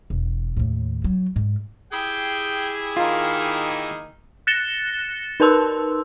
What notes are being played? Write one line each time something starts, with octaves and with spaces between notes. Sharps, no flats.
E1
D#2 A2
F#3
G#2
E4 G4 G#4 G5
D#3 A#3 D#4 F4
F#6 A6 A#6 C#7 E7 G7
D#4 A#4 B4 A5 C6 E6